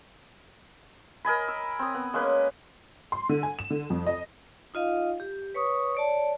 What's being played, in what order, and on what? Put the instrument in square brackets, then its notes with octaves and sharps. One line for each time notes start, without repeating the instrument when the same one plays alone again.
[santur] A#4 D#5 G#5 B5
E6
C4 D#6
B3
G#3 A#3 C#4 B4
[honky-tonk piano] C6
D3
G#5
E7
D3
F2
D#5
[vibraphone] D#4 F4 D#5 F5
G4
B4 C#5 C#6 D#6
C#5 D5 A5